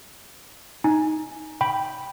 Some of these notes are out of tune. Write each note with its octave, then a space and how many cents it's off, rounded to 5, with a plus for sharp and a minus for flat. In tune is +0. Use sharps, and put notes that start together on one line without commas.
D#4 +0 G#5 +5
G5 +0 B5 +0